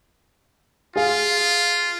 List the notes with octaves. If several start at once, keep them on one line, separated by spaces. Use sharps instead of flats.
F4 G#4 F5